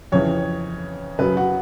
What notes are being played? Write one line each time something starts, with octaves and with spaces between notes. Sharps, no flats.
F2 C#3 E3 C#5
F#2 C#3 F#3 B4
F#4